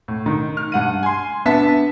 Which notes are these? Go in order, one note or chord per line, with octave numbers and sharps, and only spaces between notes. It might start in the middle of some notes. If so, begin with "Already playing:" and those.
A2
D#3
F6
G2 F#5 D#7
G#5 C6
B3 D4 E5 A5 B6